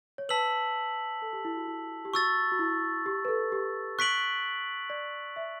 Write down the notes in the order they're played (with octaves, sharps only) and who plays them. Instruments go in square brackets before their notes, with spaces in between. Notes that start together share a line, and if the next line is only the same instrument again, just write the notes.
[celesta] C#5
[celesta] B4 [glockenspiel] A5 E6 B6 F#7
[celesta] A4
G4
E4
F#4
E4
G4
[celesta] F#4 [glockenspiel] C#6 E6 A6
[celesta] F#4
E4
G4
B4
A4
G4
[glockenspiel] C#6 F#6 B6 D7 F#7
[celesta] D5
E5